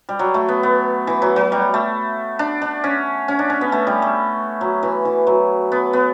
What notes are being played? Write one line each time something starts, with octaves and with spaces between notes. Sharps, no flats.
G3
F#3
A3
B3
B3
E3
F#3
F#3
G3
A3
D4
D4
C#4
C#4
D4
C#4
B3
A3
G3
A3
F#3
E3
E3
F#3
B3
B3